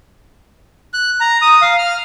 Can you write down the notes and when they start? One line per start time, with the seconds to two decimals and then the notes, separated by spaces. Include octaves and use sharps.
0.94 F#6
1.21 A#5
1.42 D#6
1.62 F5
1.78 F6